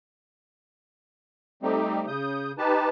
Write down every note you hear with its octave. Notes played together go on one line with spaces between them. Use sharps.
G3 A3 C4 D#4 G4
C#3 D#6 G6
D#4 G4 B4 A5